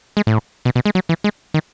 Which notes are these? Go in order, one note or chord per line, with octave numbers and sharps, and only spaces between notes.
G#3
A2
B2
B2
G#3
F#3
E3
G#3
D#3